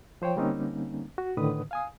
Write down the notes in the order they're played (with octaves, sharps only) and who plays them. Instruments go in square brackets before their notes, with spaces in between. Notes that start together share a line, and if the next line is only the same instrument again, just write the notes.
[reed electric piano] F3 C5 C#5 G5
D3 G3 A#3 C4 C#4 D#4
F#4
A2 D3 D#3 B4 D#6
F5 G#5 D#6